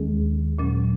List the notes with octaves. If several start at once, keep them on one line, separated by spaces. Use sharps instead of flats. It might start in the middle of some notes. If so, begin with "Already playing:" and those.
Already playing: D#2 D#3 G#3 C#4 G#4
A#2 F#3 C#4